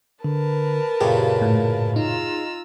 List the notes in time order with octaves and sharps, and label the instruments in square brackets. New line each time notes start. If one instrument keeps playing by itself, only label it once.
[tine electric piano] D3 [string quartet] A#4 B4 A5
[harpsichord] F#2 A#2 C#3 [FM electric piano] G4 [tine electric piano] G#4
[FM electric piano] A2
[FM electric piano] D#4 [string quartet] F4 A#5 E6